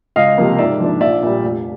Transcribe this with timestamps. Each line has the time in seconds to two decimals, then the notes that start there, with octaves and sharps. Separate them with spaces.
0.16 C#2 D#5 F5
0.38 C3 F3 A#3
0.59 G#2 D5 E5
0.80 F3 A#3 D4
1.01 A#1 D5 E5
1.23 A#2 G3
1.43 F1